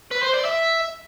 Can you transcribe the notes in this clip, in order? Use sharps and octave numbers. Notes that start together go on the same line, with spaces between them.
B4
C5
D5
E5